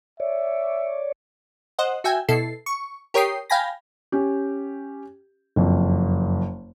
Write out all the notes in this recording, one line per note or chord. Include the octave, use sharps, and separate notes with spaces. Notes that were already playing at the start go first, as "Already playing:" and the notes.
C#5 D5 E5
C5 D#5 F#5
F#4 E5 G5 G#5
B2 E4 A4 C7
C#6
G4 A#4 C#5 G5 D#6 C7
F5 G5 G#5 B5 A#6
C#4 G4
F#1 F2